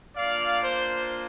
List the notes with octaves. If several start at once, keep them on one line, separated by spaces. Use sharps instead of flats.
A#3 D4 F4 D5 F5
C5